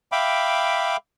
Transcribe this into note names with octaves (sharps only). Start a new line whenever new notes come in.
E5 F5 G5 B5 D6